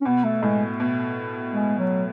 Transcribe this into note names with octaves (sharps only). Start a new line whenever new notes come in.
C#4
B2 B3
A3
A2 G#3
B2
G#3
F#3